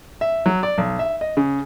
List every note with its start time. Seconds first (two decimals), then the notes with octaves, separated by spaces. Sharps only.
0.21 E5
0.46 F#3
0.63 D5
0.78 B1
0.99 E5
1.21 D#5
1.37 C#3